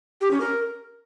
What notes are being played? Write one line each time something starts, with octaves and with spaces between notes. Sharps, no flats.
G4
C#4
A#4